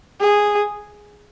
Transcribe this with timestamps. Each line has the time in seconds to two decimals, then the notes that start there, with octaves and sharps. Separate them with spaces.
0.21 G#4